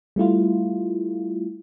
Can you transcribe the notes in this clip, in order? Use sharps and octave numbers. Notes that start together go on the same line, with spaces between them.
G3 A3 E4 F4